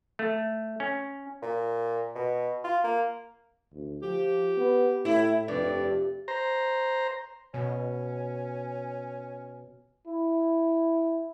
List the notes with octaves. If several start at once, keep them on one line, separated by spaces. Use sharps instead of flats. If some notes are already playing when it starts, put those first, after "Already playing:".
A3
C#4
A#2
B2
F4
A#3
D2
F3 G4
B3
A2 E4
F1 G2 D5
C5 A#5
B2 C#4
E4